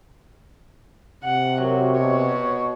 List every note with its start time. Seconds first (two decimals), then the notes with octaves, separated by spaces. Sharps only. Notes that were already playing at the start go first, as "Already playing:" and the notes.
1.24 C3 F#5
1.61 F#3 A#4
1.97 B2 C#5